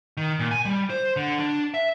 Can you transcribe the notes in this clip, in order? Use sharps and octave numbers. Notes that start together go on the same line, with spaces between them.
D#3
A#2
G#5
G3
C5
D3
D4
E5